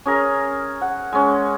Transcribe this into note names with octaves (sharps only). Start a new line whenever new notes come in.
C#4 G#4 A#4
F#5
G#3 C#4